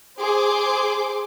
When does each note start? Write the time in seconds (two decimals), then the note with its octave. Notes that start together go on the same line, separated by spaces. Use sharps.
0.18 G#4 C5 C6 D6